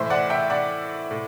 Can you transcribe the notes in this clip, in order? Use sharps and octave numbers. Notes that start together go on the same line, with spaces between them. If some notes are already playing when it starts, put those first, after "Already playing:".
Already playing: A2 E3 C5 E5
D5 F#5
E5 G5
D5 F#5
A2